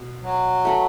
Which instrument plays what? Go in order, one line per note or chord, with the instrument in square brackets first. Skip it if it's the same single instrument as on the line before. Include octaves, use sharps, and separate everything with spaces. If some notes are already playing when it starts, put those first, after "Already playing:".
Already playing: [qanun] B2
[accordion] F#3
[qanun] A3 F#4 B4